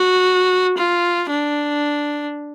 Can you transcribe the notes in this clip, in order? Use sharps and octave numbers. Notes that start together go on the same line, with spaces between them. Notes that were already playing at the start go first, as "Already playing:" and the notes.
Already playing: F#4
F4
D4